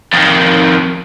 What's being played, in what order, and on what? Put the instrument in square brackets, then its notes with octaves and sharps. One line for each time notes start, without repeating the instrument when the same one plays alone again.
[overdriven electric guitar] F2 D#3